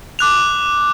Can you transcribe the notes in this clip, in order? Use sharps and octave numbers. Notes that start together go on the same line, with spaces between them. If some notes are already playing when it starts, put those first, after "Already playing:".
D6 F#6 F7